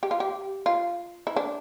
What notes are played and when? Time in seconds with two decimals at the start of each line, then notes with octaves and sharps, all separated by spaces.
0.03 G4
0.11 F4
0.20 G4
0.66 F4
1.27 E4
1.36 D4